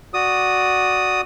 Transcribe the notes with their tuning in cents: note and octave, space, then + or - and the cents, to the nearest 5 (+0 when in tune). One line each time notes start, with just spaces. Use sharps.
F#4 +0 D5 +0 D#6 +0